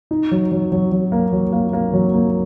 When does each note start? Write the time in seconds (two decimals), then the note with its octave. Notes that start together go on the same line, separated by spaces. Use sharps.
0.11 D#4
0.31 F#3
0.52 F#3
0.72 F#3
0.92 F#3
1.12 A#3
1.33 F#3
1.53 A#3
1.73 A#3
1.93 F#3
2.14 A#3